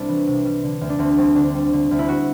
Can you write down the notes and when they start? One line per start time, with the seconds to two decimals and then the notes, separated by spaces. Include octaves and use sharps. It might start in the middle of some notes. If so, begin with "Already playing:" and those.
Already playing: C2 G3 C4 D4 E4
0.09 E3
0.27 C3
0.45 G3
0.64 D3
0.81 D2
0.90 D4
0.99 D2 C4
1.18 G3 C4
1.36 D3 D4
1.55 G3
1.73 D3
1.91 D2
1.99 E4
2.09 F#4